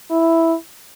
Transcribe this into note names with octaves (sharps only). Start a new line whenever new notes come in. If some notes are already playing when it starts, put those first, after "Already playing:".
E4